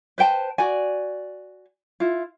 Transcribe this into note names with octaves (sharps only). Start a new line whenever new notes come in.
B4 C5 G5 A5
F#4 D5 G#5
E4 F4